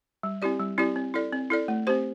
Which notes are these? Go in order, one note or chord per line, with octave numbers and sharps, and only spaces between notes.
G3
C4 E4 G4 D5
G3
C4 E4 G4 D5
C4
E4 A4 D5
C4
E4 A4 D5
A3
C4 G4 C5